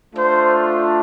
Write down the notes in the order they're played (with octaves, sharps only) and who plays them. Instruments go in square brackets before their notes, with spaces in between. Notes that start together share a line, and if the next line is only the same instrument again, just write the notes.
[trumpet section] A3 D4 F4 C5